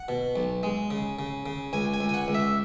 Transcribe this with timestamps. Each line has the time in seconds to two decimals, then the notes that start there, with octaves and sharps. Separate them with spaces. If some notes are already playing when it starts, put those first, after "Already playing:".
Already playing: F#5
0.08 B2
0.36 B1
0.63 G#3
0.91 C#3
1.19 C#3
1.46 C#3
1.73 C#2 G#5
1.94 G#5
2.01 C#2
2.09 G#5
2.14 F#5
2.28 C#2
2.35 E5